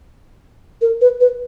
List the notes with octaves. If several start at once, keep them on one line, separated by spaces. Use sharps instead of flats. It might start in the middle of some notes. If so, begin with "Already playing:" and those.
A#4
B4
B4